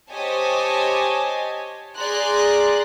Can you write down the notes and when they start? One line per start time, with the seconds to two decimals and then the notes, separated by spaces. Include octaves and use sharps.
0.11 G4 C5 C#5 D#5 G#5 A5
1.97 G#4 D5 A#5 C6 F#6